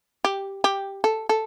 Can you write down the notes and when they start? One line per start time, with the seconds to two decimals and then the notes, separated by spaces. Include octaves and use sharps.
0.24 G4
0.64 G4
1.04 A4
1.29 A4